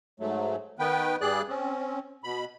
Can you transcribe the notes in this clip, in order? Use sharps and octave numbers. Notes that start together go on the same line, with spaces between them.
G#2 F#3 A3
D#3 B3 B4 G5
G2 G3 G#4 D5 F#6
C4 C#4
B2 B5